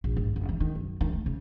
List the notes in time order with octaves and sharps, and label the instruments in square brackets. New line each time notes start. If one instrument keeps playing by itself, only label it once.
[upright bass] A#1
G#1
F#1
E3
D#3
F#2
D#3
A3
C#3